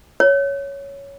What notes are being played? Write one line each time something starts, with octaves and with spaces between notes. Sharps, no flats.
C#5